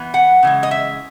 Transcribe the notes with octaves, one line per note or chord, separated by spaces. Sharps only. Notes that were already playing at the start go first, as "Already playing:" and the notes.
Already playing: E3 B3
F#5
C#3 E3 G#3
D#5
E5